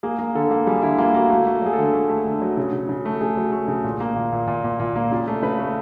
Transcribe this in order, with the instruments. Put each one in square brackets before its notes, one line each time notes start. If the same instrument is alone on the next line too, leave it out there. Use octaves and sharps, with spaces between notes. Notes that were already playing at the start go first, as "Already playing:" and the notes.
[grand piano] A#3 G#4
A#3
D3 A4
A#3
G3 G#4
D3 E4
A#3 F4
A#3 F#4
A3 F#4
A3
F#3 G#4
A4
D3
A3
A3
D3
F#3
C#3
C#3
C#3
A3
C#3 G#4
F#3
A3
C#3
A#2
A#3
A#2
A#2
A#2
A#2
A#2
A#3
C#3 F4
A3
C#3 B4
A3